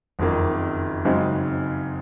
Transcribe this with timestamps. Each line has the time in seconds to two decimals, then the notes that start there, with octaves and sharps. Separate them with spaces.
0.19 F#1 F2 D#3 A#3
1.05 F#2 C#3 G#3 C4 D#4